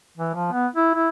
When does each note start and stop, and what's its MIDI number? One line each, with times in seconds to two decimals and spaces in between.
0.17 0.35 52
0.35 0.48 53
0.52 0.67 59
0.76 0.91 64
0.94 1.09 64